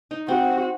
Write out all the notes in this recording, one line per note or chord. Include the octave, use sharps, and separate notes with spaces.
D#4
C4 F#4